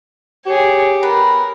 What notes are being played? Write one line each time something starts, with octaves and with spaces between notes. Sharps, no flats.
G4 G#4 C#5
B3 A#4 B4